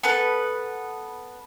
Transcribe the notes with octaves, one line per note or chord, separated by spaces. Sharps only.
B3 A4 B4